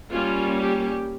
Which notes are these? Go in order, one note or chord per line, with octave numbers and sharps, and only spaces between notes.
G3 A#3 C#4 F4
G4